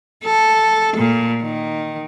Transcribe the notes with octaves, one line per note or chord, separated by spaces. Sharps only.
A4
A#2
D#3